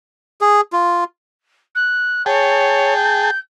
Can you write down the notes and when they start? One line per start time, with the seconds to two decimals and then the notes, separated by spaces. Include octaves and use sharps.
0.41 G#4
0.73 F4
1.75 F#6
2.26 G#4 C#5 G5 A5
2.96 G6